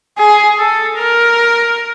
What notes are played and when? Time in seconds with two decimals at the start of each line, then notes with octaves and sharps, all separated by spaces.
0.18 G#4
0.58 A4
0.97 A#4